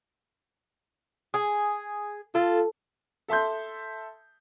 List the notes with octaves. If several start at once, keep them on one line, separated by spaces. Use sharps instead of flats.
G#4
F4 A4
A4 E5 A5 C6 G6